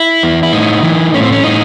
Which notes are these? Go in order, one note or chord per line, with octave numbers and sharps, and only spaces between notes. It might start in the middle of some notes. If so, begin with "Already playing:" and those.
Already playing: E4
E2
E4
A2 D#4
E3
A2 C#4
C4
C#4
A2 D#4